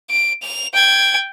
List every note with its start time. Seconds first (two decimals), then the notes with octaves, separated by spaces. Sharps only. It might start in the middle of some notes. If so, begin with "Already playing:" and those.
0.10 D7
0.42 F7
0.73 G5 G#6